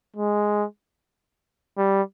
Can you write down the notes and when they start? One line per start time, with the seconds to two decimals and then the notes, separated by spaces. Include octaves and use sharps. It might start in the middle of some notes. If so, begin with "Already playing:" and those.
0.16 G#3
1.78 G3